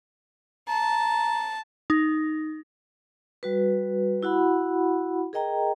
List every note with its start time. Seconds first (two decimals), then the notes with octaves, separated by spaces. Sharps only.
0.69 A5 A#5
1.90 D#4
3.43 G3 F#4 B4
4.23 E4 F#4 F#5 B5
5.33 G#4 A#4 D#5 G5 A#5